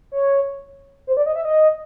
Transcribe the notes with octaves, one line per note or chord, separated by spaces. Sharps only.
C#5
C5
D5
D#5
E5
D#5